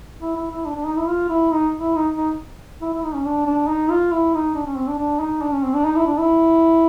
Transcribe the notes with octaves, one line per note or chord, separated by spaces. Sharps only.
E4
E4
E4
D4
D4
D#4
E4
F4
E4
D#4
E4
D#4
D#4
E4
E4
D#4
C#4
D4
D4
D#4
F4
E4
D#4
D4
C#4
C4
D4
D4
D#4
D4
C#4
C4
D4
D#4
E4
D4
E4